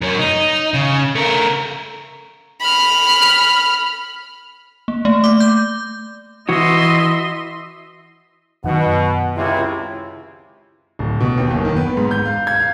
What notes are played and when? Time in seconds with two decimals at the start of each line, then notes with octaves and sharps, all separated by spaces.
0.02 F#2 C#4
0.19 D#4
0.74 C#3
1.15 A3 A#4
2.61 B5 F6
4.88 A#3
5.05 A3
5.24 D6
5.40 G6
6.49 E3 F#4 D#5 E5 C6
8.64 F#2 B2 D#3 F#5
9.36 C#2 C3 E4
10.99 D1
11.20 B2
11.37 D#2
11.51 F#1
11.65 D#3
11.76 B3
11.97 G#2
12.11 G6
12.25 F5
12.47 G#6
12.60 F5